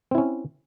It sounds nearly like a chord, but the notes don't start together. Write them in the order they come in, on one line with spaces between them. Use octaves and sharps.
C4 E4 C#4